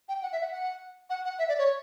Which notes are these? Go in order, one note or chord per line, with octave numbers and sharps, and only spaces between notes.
G5
F#5
E5
F#5
F#5
F#5
F#5
E5
D5
C#5